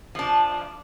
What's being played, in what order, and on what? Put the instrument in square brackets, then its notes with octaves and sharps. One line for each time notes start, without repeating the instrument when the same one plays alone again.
[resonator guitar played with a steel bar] F3 D4